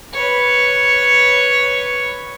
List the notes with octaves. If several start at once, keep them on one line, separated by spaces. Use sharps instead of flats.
B4 C#5